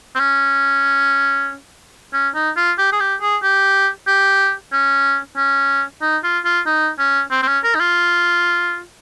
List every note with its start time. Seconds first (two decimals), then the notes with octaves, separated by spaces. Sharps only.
0.15 C4
0.19 C#4
2.13 C#4
2.35 D#4
2.57 F4
2.78 G4
2.92 G#4
3.00 G4
3.21 G#4
3.43 G4
4.07 G4
4.73 C#4
5.37 C#4
6.02 D#4
6.23 F4
6.45 F4
6.66 D#4
6.99 C#4
7.31 C4
7.42 C4
7.47 C#4
7.64 A#4
7.75 D#4
7.80 F4